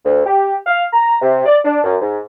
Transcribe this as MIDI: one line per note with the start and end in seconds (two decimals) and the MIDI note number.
0.05 0.20 38
0.26 0.56 67
0.67 0.84 77
0.93 1.16 82
1.22 1.45 48
1.46 1.57 74
1.64 1.80 62
1.84 1.96 42
2.01 2.19 44